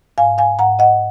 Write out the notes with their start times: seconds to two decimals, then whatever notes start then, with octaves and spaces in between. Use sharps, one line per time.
0.18 G#2 F5 G#5
0.38 F5 G#5
0.59 G#2 F#5 A#5
0.79 D#5 F#5